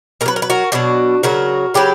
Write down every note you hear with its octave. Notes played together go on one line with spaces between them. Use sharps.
B2 A#4
F#3 B4
A#4
B4
F#4 A#4
B2 F#3 D4 F#4
C#3 F#3 F#4 A#4
C#3 F#3 G4 B4